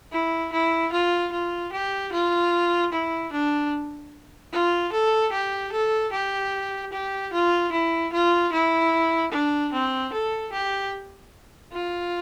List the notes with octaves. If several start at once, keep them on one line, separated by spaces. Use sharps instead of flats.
E4
E4
F4
F4
G4
F4
E4
D4
F4
A4
G4
A4
G4
G4
F4
E4
F4
E4
D4
C4
A4
G4
F4